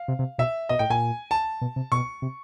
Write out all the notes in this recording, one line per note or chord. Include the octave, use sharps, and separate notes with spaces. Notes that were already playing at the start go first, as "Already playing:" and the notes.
Already playing: F5
C3
C3
B2 E5
B2 D#5
A2 G5
A#2 G#5
A5
B2
C3
B2 C#6
C3